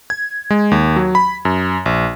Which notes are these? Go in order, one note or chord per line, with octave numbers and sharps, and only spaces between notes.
G#6
G#3
D#2
F#3
B5
F#2
A#1